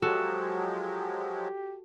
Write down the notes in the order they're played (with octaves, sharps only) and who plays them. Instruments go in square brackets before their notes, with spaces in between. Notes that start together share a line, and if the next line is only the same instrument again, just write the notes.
[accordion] F3 F#3 G#3 [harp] F#4 A4 [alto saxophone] G4